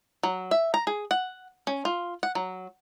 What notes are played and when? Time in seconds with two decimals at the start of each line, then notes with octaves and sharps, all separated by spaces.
0.23 F#3
0.51 E5
0.74 A#5
0.87 G#4
1.11 F#5
1.67 C#4
1.85 F4
2.23 F#5
2.35 F#3